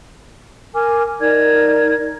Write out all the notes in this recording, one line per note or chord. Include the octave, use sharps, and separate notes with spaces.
A#4 G#5 D6 F6
D#4 A#4 D5 G#6